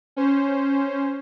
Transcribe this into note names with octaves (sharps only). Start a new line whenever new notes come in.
C#4 C5